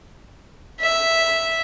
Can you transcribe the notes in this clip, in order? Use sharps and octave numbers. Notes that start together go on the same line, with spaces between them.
E5